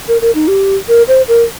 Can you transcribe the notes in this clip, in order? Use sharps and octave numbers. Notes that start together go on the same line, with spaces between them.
A#4
A#4
D#4
G4
A#4
C5
A#4